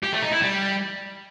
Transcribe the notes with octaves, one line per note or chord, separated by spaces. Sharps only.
G4
A3
D#4
E4
G3